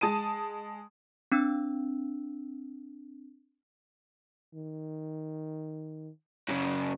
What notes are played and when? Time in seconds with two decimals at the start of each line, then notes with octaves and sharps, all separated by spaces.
0.01 G#3 A5 D#6 D#7
1.32 C4 D4 E6
4.54 D#3
6.49 F#2 C#3